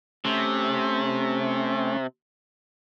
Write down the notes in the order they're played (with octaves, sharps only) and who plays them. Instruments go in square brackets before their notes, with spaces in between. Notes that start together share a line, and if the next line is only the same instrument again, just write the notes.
[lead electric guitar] C3 [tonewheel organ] A3 C#4